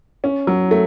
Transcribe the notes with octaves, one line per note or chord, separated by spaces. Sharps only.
C#4
F#3
A3